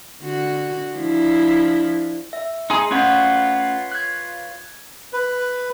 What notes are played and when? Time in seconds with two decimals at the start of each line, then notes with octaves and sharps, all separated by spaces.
0.22 D3 F#4
0.95 F3 D4 E4
2.33 E5
2.70 D#4 G#4 C6
2.91 A3 C#4 F4 B4 C#5 F#5
3.92 F#6 G#6
5.13 B4